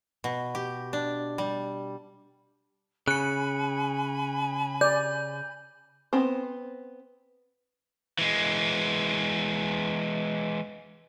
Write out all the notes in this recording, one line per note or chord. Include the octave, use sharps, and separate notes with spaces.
B2
G4
D4
G3
C#3 G#5 B5 F#6 C#7
D5 G6
B3 C4 C5
E3 G#3